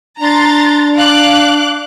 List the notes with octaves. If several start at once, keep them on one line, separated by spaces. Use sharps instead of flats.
D4 A#5 C6 A6
F5 D6 F#6